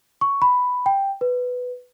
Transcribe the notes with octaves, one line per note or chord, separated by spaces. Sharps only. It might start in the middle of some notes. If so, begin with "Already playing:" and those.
C#6
B5
G5
B4